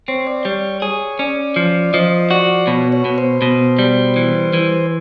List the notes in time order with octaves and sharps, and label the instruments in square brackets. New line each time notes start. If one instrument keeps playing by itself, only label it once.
[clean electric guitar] C4 [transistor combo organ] C#5
[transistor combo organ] D5
[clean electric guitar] G3 [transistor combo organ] C#5
[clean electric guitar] G#4 [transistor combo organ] C#5
[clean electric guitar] C#4 [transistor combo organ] D5
[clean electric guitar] F3
[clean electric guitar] F3 [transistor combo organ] D#5
[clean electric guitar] F#4 [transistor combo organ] D5
[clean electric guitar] B2 [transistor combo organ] C#5
[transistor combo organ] C#5
[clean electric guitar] B2
[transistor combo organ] C5
[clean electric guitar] B2
G3
E3
E3